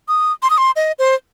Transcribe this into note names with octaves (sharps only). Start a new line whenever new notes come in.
D#6
C6
D#6
C6
D#5
C5